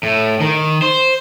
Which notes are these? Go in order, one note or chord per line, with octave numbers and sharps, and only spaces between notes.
A2
D#3
C5